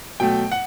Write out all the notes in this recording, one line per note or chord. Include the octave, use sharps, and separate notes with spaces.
B2 F#3 A3 G5
F#5